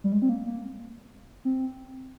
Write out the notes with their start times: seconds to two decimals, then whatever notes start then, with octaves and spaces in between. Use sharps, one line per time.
0.04 G3
0.12 G#3
0.22 C4
0.29 A#3
0.46 A#3
1.45 C4